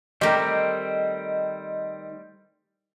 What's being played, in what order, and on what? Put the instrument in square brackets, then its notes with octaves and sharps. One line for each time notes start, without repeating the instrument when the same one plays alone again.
[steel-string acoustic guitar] D#3 A3 [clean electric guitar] G3 C4 [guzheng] G4 A#4 [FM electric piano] D#5